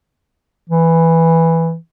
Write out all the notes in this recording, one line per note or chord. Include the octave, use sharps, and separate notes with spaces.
E3